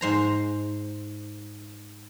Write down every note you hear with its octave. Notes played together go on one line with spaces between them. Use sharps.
G#2 C5 A#5